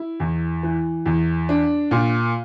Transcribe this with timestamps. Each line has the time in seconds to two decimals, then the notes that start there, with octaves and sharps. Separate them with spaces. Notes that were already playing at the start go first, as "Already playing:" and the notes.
Already playing: E4
0.20 E2
0.63 E3
1.06 E2
1.49 D4
1.91 A#2